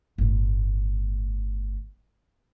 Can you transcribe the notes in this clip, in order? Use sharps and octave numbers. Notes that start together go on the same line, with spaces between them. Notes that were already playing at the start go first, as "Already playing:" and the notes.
G1 A2